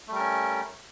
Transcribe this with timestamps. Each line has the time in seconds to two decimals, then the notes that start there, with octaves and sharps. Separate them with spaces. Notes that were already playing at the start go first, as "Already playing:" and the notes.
0.08 A3
0.11 G3
0.15 A#4
0.19 C#4